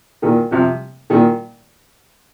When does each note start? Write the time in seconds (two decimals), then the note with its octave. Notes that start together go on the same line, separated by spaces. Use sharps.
0.22 A#2 D#3
0.51 C3 F3
1.10 A#2 D#3